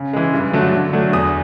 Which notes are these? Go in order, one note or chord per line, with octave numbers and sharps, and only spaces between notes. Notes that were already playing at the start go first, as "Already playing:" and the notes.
Already playing: C#3
E3 G#3
G2
D3 F#3 A3
D3
F#3 A3 D4
E2 D#6